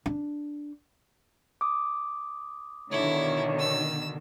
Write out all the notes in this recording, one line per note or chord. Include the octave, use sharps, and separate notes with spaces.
D4
D6 D#6
B2 D3 D#3 E4 C#5
E6